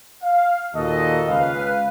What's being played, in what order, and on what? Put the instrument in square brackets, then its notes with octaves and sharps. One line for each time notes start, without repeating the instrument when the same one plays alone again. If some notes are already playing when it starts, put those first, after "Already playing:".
[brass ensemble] F5
D#2 A#2 F#4 A4 D#5
C#2 B4 F5